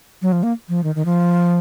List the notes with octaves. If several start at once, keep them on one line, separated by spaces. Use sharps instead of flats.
F#3
F3
A#3
F3
D#3
D#3
F3